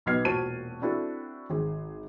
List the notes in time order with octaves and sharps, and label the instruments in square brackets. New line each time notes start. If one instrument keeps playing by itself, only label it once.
[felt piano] B1 B3 D#5 F6 G#6 C7
E1 A#2 F#4 C5 A5 D#7
C4 D4 E4 F#4 A4
G#1 G#4